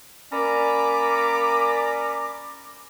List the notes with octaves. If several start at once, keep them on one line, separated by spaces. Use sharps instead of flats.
A#3 C#4 D5 A#5 B5 D6